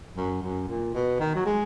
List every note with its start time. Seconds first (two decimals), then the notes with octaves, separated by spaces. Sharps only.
0.17 F#2
0.43 F#2
0.68 A#2
0.94 B2
1.20 D#3
1.35 F#3
1.46 G#3